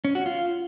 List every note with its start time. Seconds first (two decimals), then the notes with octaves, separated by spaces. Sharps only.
0.05 C#4
0.15 F#4
0.26 F4